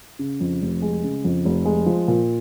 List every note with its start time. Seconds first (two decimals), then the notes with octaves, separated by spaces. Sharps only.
0.19 C#3
0.40 F2
0.62 F1
0.82 G#3
1.04 C#3
1.24 F2
1.45 F1
1.65 G#3
1.86 F3
2.08 A#2